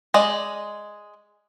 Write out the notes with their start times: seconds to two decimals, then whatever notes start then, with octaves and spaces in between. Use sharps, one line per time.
0.14 G#3 D5 D#5